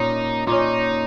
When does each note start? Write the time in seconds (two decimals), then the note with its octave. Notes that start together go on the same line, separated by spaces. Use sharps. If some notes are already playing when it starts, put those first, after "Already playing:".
Already playing: A#2 A#3 C#4 D#4
0.47 A#2 A#3 C#4 D#4